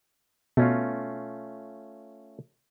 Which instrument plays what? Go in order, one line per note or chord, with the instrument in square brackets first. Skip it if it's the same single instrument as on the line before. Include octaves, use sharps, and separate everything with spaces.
[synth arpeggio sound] B2 [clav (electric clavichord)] A3 C#4 F4